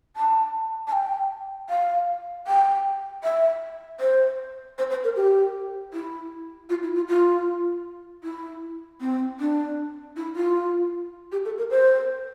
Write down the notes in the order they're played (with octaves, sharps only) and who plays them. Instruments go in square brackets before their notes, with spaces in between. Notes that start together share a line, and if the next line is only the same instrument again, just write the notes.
[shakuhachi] A5
A5
G5
F5
G5
E5
C5
C5
C5
A#4
G4
E4
F4
E4
F4
F4
E4
C4
D4
E4
F4
G4
A4
A#4
C5